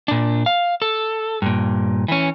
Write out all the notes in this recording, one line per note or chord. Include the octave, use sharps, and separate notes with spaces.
A#2 D4
F5
A4
G2 A#2
E3 C#4